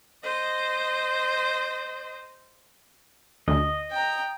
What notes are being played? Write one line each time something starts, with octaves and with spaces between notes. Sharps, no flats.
C5 D#5
D2 D#5
G5 A#5